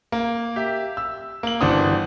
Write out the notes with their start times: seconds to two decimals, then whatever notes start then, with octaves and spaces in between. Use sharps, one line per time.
0.12 A#3
0.56 G4 E5
0.97 E6
1.43 A#3 F#7
1.61 G1 E3 D4 F#4 C5 D#6